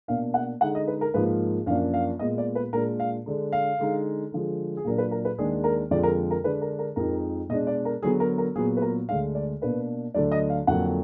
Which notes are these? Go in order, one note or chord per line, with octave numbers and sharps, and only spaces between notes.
B2 A#3 D4 F5
F#5
D3 G#3 D#4 F#5
D#5
B4
A#4
G#2 F3 A#3 B4
F#2 F3 A#3 D4 F5
F5
A#2 G#3 B3 D#5
D5
B4
A#2 G#3 D4 A#4
F5
D3 G#3 D4
F5
D3 G#3 D#4
D3 F3 G#3
G#4
A#2 F#3 D4 A#4
B4
A#4
B4
D#2 D#3 G#3 D4 G#4
A#4
F2 D3 F3 G#3 D5
A#4
A#4
D3 G#3 D4 B4
A#4
A#4
F2 F3 G#3 D#4 A#4
B2 G#3 D4 D#5
D5
A#4
D3 F#3 B3 G#4
A#4
A#4
A#2 F#3 B3 G#4
B4
A#4
D2 D3 G#3 D4 F5
D5
B2 A#3 D4 B4
D2 D3 F#3 D4 D5
D#5
F5
F2 D3 F#3 A#3 F#5